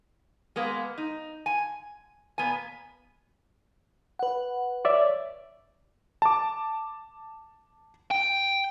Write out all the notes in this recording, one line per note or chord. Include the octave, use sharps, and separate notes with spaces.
G#3 A#3 B3
D#4
G#5
A#2 B3 G#5
B4 F#5
C#5 D5 E5
A5 D6
G5